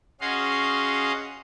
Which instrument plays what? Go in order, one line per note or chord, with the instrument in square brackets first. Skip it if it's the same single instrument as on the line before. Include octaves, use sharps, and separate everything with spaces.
[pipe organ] C#4 F#4 G#4 D#5 F5 C6